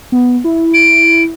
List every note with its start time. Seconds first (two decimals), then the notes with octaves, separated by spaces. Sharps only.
0.12 B3
0.44 E4
0.74 D7